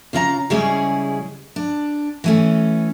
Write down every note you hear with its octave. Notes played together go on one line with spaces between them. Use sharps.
C#3 F4 D#5 A#5
C#3 G3 G#3 C#4 E4 G#4
D4
E3 A3 C#4